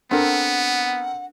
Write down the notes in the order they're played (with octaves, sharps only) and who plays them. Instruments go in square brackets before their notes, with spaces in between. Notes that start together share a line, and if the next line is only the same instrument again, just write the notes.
[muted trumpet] B3 [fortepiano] C4 A4 A#4 [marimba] D4 [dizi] F#5